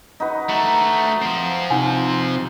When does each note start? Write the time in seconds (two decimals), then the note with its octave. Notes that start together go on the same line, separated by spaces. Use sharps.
0.20 D#4 F#4 B4
0.49 A3 F#4 A#5
1.22 F3 C4
1.70 C3 D#4 F#5 G#5